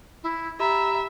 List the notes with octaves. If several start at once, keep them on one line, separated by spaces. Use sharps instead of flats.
E4
G4 E5 A#5 B5